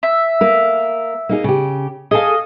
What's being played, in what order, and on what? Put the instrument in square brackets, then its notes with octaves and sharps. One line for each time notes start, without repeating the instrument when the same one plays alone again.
[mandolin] E5
[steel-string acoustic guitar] A#3 A#4
A#3 D#4 G#4
C#3 G4
[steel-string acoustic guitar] G#4 A4 G#5 [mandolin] D#5 F5